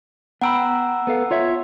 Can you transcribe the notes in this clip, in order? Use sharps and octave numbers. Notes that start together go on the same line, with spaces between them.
B3 F#5 G5 A#5 B5 E6
B3 A4 F5
F4 C#5 E5